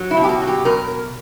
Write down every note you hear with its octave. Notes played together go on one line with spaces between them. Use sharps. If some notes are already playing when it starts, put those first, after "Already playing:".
Already playing: F#3
E4
B2
G4
F#4
F#3
G4
B2 A#4